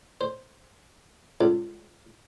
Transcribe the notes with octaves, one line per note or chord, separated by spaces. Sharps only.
C5
C#2